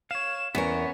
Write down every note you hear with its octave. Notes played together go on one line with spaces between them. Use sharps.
C#5 F5 E7
E2 B3 C#4 A#4 C#5